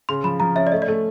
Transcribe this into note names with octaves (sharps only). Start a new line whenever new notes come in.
C#3 C6
F3 B5
F3 A#5
C#4 E5
D5
A3 D#5
D5
A3